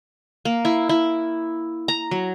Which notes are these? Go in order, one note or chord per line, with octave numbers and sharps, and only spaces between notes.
A#3
E4
E4
A#5
F#3